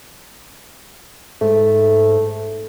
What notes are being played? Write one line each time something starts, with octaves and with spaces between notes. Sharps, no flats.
G#2 A3